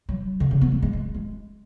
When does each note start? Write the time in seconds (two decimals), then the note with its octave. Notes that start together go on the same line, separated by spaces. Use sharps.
0.09 F#3
0.40 D3
0.51 C#3
0.61 B3
0.72 A3
0.82 G#3
0.93 G#3
1.15 G#3